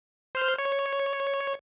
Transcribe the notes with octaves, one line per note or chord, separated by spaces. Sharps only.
C5 F6 G6
C#5